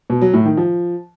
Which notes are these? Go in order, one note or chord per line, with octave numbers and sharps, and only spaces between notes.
B2
F#3
A2
D#3
F3